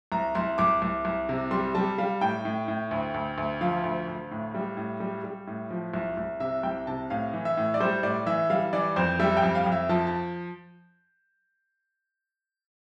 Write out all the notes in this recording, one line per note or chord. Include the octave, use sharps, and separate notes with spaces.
C2 A#5
C2 C6
C2 D6
C2
C2
C3
G3 C6
G3 A5
G3 F5
A2 G5
A2
A2
D2
D2
D2
F3 F5
D2
D2
A2
G3
A2
G3
G3
A2
F3
C2
C2
C3 E5
C2 G5
C3 A5
A2 F5
E3
E5
A2
D5
G3 C5
A2 D5
E3 E5
G3 F5
E3 D5
F2 C5
G3 E5
G5
F2
F5
F2
E5
F3 A5
A5